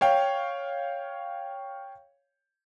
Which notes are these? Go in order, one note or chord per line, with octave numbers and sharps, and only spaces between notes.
C#5 F5 G5